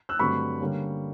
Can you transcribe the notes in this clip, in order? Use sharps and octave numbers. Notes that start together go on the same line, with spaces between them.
E6 F#6
G2 D3 F#3 A3 C4 B5 C#6
D3 G3 A#3 C#4